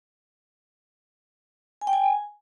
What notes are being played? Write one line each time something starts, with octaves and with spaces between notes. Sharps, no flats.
G#5
G5
G#5